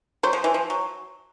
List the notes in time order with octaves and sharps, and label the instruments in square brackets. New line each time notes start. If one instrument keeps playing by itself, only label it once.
[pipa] F#3 [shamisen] C5
[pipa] F3
E3
F3
F#3